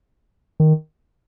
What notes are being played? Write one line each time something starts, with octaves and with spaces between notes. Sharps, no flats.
D#3